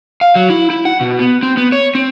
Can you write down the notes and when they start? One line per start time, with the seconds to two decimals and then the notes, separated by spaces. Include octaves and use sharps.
0.21 F5
0.35 F#3
0.50 E4
0.70 E4
0.85 F#5
1.01 B2
1.19 B3
1.43 C4
1.57 B3
1.72 C#5
1.95 C4